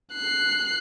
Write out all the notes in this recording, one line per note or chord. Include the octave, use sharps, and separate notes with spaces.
F#6 C7